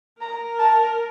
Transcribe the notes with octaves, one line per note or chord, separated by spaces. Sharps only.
A#4 A#5
A5